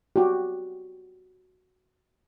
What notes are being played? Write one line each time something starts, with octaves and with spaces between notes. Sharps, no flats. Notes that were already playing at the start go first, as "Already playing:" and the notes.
F#4 G4